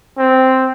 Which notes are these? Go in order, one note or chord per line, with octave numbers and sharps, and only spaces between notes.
C4